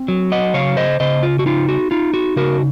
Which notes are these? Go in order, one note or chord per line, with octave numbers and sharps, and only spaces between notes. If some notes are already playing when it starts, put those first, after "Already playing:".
Already playing: C4
F#3
D#5 F#5
C#3 C#5 F5
C5 D#5
C#3 C5 D#5
F4
F#4
D#4 F4
F#4
D#4 F4
F#4
C#3 F#4 A#4